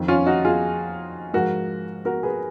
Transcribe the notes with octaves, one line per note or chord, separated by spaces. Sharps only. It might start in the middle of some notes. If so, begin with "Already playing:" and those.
Already playing: F2 D#3
C#4 F4
D#4 F#4
F4 G#4
G#2 F3 F#4 A#4
F#4 A#4
G#4 B4